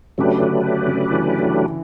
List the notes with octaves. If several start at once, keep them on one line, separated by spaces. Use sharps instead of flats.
C#3 F#3 A3 D4 G4 B4
D3
C#3
E3
E3